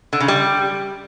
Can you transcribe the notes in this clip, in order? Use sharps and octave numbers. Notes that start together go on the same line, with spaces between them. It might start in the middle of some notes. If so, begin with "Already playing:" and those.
D3
C#3
G3